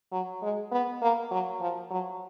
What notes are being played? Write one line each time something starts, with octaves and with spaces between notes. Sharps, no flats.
F#3
G#3
B3
A#3
F#3
F3
F#3